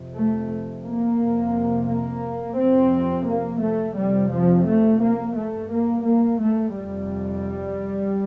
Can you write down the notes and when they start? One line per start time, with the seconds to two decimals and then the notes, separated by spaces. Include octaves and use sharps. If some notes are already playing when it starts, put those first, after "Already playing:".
Already playing: F2 C3
0.15 A3
0.84 A#3
1.19 F2 C3
1.88 A#3
2.58 F2 C3 C4
3.28 A#3
3.62 A3
3.97 F2 C3 G3
4.32 F3
4.67 A3
5.02 A#3
5.36 G2 A3
5.71 A#3
6.06 A#3
6.40 A3
6.75 F2 C3 G3